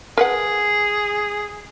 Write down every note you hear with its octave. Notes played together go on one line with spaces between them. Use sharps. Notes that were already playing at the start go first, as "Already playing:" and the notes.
G#4 A#4 B4 F#5